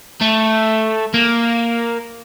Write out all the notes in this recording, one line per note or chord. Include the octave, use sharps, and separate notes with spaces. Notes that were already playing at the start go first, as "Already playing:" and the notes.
A3
A#3